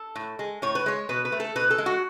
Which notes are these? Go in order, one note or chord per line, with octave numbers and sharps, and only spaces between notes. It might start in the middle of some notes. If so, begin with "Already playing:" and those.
Already playing: A4
A2
G#3
A2 C#5
B4
G#3 C#5
B2 B4
B4
A3
A4
B2 B4
A4
G#3
F#4